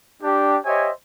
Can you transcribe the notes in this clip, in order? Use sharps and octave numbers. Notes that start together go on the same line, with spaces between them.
D4 G4
G4 C5 C#5 D#5 E5 G#5